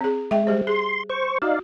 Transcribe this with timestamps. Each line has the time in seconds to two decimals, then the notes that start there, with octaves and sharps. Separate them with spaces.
0.01 C4 G#4
0.31 G#3 E5 G5
0.47 G3 G4 C5
0.67 G#4 C6
1.10 C5 C#6
1.42 D#4 F#4 D5 F5